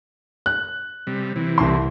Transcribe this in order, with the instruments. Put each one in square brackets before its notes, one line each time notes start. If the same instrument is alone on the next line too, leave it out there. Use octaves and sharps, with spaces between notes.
[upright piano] F#6
[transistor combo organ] C3 G3
C3 E3
[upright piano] C2 C6